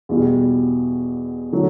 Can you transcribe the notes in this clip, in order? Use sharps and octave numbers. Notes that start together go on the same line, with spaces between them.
E2 B2 G3
D3 F#3 A3